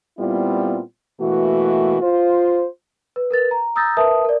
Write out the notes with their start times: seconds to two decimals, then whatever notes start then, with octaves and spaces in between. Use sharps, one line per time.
0.18 A#2 G3 B3 C4 E4 F4
1.20 B2 E3 A3 A#3 F#4
2.02 F4 C5
3.16 B4
3.31 A#4 B4 A6
3.51 A#5
3.76 A#5 D#6 E6 G6 A6 A#6
3.97 A#4 B4 E5 A5 D#6
4.25 A#4 D5